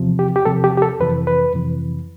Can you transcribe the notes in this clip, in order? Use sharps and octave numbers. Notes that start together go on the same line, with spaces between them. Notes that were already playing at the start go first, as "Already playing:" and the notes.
Already playing: E2 C3 F3
G4
G4
E2 C3 F3 A4
G4
G4
A4
F2 C3 E3 B4
B4
F2 C3 E3